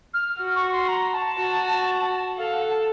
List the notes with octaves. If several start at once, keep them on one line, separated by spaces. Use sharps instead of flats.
F6
F#4
C#6
C6
A#5
A5
F#4
A4 F5
F#5
A5